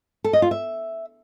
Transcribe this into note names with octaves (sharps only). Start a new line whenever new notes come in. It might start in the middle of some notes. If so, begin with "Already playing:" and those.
A4
D#5
F4
E5